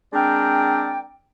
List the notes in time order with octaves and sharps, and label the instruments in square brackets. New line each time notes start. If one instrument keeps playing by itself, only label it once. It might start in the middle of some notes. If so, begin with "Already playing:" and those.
[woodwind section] G#3 C4 D4 A#4 D5 G5